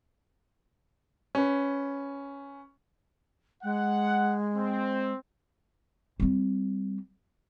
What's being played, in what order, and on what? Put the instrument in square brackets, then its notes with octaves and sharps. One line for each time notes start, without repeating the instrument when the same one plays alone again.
[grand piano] C#4 B4
[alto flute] G#3 [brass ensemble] F#5
[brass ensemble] C4
[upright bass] G3 C4